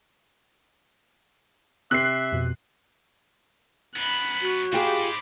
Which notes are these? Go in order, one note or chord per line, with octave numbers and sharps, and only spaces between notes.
C3 E5 F#6 C7
F2 B2
F#2 B3 B5 F#6
F#4
D#4 F4 G4 G#4 C5 B5 D6